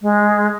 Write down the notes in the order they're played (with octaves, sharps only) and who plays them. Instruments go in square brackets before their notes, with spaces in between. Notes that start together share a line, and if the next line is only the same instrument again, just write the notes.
[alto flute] G#3